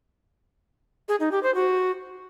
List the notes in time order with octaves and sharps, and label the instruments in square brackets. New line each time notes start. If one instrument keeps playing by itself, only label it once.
[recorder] G#4
D#4
G4
C5
F#4